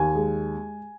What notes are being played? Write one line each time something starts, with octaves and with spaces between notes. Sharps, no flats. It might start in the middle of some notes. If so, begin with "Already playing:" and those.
Already playing: D#2 G#5
G#3